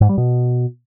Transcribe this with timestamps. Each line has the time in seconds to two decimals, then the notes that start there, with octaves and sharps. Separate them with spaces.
0.01 G#2
0.09 G3
0.18 B2